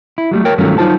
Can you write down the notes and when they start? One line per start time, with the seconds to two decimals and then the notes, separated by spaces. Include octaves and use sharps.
0.18 E4
0.31 F#3 G3 A3
0.45 A#4 C#5 G5
0.58 G2 D#3 F#3 A3 C#4 F4
0.78 F#3 D#4 F4 C5 A5